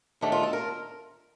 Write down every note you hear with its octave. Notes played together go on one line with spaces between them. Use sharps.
D#2 D#3 A3 D4 G4
F4
A4
A#4